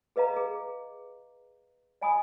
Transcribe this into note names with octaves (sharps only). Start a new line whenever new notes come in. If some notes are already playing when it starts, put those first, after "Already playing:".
G#4 B4 D#5 F5 A#5
G#4
D5 D#5 G#5 B5 D#6